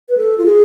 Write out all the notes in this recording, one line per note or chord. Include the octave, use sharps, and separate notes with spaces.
B4
A4
F4
G#4